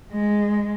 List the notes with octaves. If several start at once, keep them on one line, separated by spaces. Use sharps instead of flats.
G#3